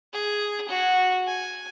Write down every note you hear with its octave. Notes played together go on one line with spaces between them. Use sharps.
G#4
F#4
G#5